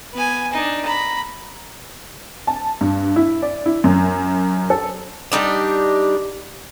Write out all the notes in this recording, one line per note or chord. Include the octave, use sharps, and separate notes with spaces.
B3 G#5
D4 D#4
A#5 B5
A5
G2
E4
D5
E4
F#2
A4
G3 D4 D#4 G4